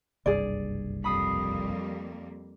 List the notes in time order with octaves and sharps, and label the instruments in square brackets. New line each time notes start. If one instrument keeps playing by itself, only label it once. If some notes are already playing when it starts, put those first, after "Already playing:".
[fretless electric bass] F#1 C2 G2 [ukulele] G#4 D5
[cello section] F2 G3 A#3 [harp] B5 D#6 C7